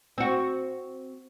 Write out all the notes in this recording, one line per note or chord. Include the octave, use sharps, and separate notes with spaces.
C4 F#4